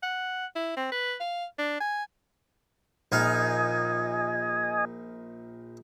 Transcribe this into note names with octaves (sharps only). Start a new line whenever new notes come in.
F#5
E4
C4
B4
F5
D4
G#5
A#1 D#4 D#5 F5 G#5